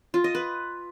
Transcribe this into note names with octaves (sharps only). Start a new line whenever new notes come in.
F4
D#5
B4